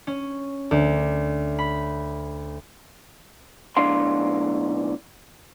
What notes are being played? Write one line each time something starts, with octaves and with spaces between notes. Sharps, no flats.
C#4
D2
B5
B1 A2 D4 F5 C6